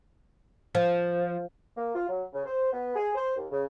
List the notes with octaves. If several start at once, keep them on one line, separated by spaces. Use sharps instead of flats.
F3
A#3
F4
F#3
C#3
C5
B3
G#4
C5
D#2
C#3